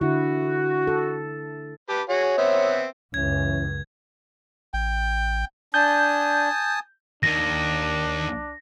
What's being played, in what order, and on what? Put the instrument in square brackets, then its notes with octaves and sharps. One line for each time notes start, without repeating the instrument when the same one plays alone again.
[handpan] D3 E4 [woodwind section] F#4
[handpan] A4
[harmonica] G4 B4 A5
[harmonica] F#4 G#4 [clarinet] C#5
[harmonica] B3 C4 E5
[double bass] C#2 F#2 [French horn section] E3 C#4 [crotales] G#6
[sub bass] A1 [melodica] G5
[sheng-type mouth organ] D4 [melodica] G#5 A5 D#6 [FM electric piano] G6
[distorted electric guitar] D#2 D#3 [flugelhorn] D4 [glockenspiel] A#6